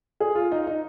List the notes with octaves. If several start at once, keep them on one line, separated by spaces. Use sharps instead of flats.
G#4
F4
D#4
D#4